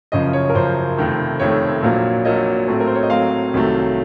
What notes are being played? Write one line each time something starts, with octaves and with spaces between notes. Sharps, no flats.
F#1 F#2 C#3 F3 D#5
C#5
A#4
F#1 F#2 C#3 F3 C5
F1 F2 D#3 A3
F1 F2 D#3 A3 C#5
A#1 A#2 F#3 A#3
A#1 A#2 F#3 A#3 D#5
A2 F#3 A3 C4
A#4
C5
C#5
D#5
A2 F#3 A3 C4 F5
C2 C3 D#3 F#3 A3